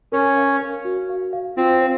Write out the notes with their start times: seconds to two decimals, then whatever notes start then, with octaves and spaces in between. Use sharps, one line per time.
0.12 C#4 A#4
0.36 F5
0.60 A#4
0.85 F#4
1.09 F5
1.33 F5
1.57 C4 F4
1.81 C5